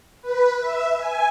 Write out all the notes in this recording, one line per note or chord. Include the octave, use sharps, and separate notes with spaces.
B4
E5
G#5